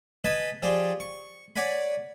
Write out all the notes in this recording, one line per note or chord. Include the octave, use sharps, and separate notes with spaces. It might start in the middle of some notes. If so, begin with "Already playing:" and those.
B4 D#5 G#5 A5 B5
F3 G4 G#4 D5
C#6
C#5 D5 F#5 G#5 B5